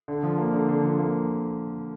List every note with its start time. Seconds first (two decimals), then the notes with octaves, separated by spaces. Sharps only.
0.08 D3
0.23 F3
0.38 A#3
0.54 D3
0.68 D3
0.84 F3
0.99 A#3